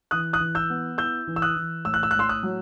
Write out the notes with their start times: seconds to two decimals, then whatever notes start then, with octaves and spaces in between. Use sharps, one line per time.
0.11 E3 D#6 F#6
0.33 D#6 F#6
0.40 E3
0.55 E6 G6
0.70 B3
0.98 E4 E6 G6
1.27 E3
1.36 E6
1.42 D#6 F#6
1.56 E3
1.85 A2 E6
1.94 F#6
2.03 E6
2.11 F#6
2.15 A2 C6 E6
2.29 D#6 F#6
2.43 F#3